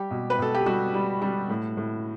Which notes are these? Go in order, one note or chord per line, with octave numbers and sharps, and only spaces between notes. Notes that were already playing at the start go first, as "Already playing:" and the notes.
Already playing: G3 G4
B2
B4
B2 A4
G4
G3 F#4
G3
G3
A2
A2